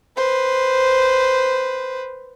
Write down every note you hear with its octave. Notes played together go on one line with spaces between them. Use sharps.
B4 C5